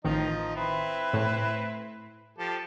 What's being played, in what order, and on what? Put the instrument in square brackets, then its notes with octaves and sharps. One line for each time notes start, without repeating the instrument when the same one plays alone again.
[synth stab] A1 D#3 [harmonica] F3 D#4
[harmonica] C4 E4 B4
[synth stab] A2
[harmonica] F3 G4 A4